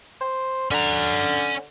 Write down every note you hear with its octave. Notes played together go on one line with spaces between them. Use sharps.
C5
D3 C#4 A#5